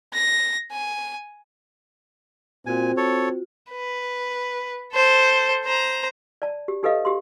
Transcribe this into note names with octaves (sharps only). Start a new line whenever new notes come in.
A#6
G#5
A#2 C4 F4 F#4 G#5
A4 C#5
B4
A4 C5
C5 A#5
D5 A5
G4
D#4 G4 A4 B4 D#5 F5
G4 C6